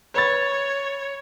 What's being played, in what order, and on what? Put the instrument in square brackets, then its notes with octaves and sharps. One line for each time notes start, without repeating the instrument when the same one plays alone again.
[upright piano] B4 B5 A6 [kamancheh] C#5